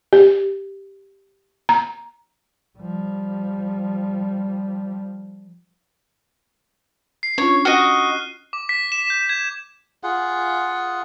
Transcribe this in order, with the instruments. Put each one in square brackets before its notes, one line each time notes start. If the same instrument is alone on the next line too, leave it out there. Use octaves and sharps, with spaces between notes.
[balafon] G4
A#5
[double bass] F3 G3
[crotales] C7
[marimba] C#4 D4 F4 [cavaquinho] C#5
[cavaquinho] F#4 D#5 [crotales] F6 F#6 D#7
[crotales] D6
B6
E7
G6
G#6
[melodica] F4 G#4 F#5